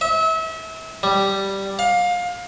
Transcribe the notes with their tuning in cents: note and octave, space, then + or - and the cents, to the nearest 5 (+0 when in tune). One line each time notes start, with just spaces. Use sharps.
E5 -35
G3 -5
F5 +25